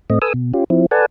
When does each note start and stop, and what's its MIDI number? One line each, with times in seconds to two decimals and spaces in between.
0.10 0.19 45
0.10 0.19 57
0.10 0.19 60
0.10 0.19 75
0.22 0.33 69
0.22 0.33 71
0.22 0.33 80
0.22 0.33 87
0.22 0.33 88
0.34 0.52 47
0.54 0.64 61
0.54 0.64 65
0.54 0.64 67
0.70 0.86 53
0.70 0.86 60
0.70 0.86 64
0.91 1.06 69
0.91 1.06 71
0.91 1.06 74
0.91 1.06 78
0.91 1.06 80
0.91 1.06 81